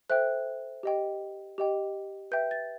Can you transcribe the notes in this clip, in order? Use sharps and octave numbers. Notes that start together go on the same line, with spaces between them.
A4 C5 E5 G5 F#6
G4 D#5 G5
G4 D#5 G5
B4 E5 G5 G6
A6